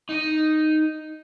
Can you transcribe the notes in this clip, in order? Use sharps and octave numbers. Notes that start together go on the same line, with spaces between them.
D#4 D#5